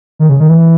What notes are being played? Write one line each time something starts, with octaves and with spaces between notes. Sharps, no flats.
D#3
C#3
D#3
E3